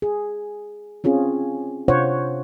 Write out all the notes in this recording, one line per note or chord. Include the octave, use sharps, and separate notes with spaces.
G#4
C4 C#4 F4 G#4
C3 D4 F4 C5 C#5 F#5